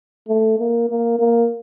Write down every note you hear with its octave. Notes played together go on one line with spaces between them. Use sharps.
A3
A#3
A#3
A#3